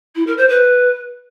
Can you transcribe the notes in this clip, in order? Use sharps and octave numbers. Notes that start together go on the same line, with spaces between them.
E4
A#4
C5
B4